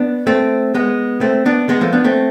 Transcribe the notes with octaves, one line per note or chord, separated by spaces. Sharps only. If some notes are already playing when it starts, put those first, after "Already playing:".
Already playing: B3 D4
A3 C4
G#3 B3
A3 C4
B3 D4
G#3 B3
F3 A3
B3 D4
A3 C4